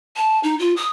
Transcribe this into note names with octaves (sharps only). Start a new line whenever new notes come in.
A5
D#4
F4
D#6